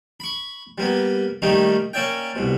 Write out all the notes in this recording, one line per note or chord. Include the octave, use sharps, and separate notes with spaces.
B5 C#6
G3 A#3 B3
D#3 G3 A3 A#3 D#4
A#3 C#4 D5 E5 G5
C2 B2